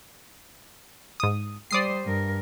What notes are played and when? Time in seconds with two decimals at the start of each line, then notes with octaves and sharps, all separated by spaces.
1.20 G#2 D#6
1.71 G3 C5 D5 D#6 C7
2.05 G2 A#4